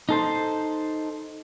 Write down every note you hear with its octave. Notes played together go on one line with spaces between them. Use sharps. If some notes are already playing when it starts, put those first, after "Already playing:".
D#4 A4 C5